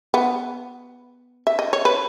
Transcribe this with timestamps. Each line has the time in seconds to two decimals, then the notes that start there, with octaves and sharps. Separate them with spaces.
0.14 B3
1.47 E5
1.59 D#5
1.73 C#5
1.85 B4